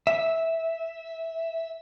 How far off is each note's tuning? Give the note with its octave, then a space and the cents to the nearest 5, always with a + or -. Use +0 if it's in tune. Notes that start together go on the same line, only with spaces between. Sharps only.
E5 -10